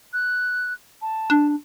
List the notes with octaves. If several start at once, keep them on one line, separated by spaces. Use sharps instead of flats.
F#6
A5
D4